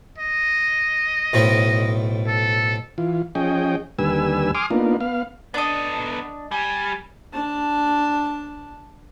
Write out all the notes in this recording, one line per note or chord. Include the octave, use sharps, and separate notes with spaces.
D#5
B1 A2 C4
A4
E3 F4
F3 C#4 G#4 D#5 G5
D#2 D3 G3 B4 G#5 E6
G#5 C6 D6 D#6 F6
A#3 B3 D4 D#4 F4
B3 F5
B3 D4 A4 D#5
G3 G#5
D4 A5